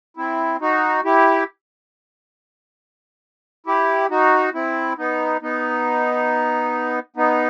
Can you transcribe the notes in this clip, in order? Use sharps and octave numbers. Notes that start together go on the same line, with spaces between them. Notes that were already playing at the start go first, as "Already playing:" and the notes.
C4 E4
D#4 F#4
E4 G4
E4 G4
D#4 F#4
C4 E4
B3 D#4
B3 D#4
B3 D#4